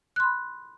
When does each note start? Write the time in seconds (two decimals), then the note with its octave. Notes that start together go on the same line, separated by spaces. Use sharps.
0.16 F#6
0.20 C6
0.24 B5